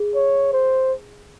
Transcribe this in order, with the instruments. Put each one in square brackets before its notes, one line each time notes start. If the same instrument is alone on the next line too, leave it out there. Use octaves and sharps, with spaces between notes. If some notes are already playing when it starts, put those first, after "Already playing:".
Already playing: [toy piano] G#4
[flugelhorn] C#5
C5